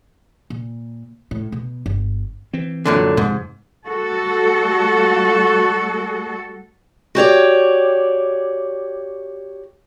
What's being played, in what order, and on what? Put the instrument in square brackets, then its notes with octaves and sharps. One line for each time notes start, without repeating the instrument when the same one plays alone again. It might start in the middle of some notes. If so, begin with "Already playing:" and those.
[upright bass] A#2
A2
B2
G1
[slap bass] E3 C4
[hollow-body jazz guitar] F#2 A#2 D3
[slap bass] F2 C3 F3 [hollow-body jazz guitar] G#2
[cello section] G3 A3 F#4 A4
[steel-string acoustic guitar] F#4 G4 C#5 D5